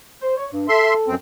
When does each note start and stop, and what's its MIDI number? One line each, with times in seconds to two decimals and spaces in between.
0.21 0.34 72
0.37 0.46 73
0.52 0.67 43
0.69 1.10 69
0.69 0.94 76
0.69 0.94 84
1.07 1.15 42
1.07 1.15 60